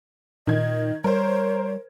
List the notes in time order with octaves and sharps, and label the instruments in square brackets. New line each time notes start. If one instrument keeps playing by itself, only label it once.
[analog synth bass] A#2 [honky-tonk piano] D#3 G#6 [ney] D#5
[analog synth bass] G3 [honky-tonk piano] A#4 C5 [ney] C#5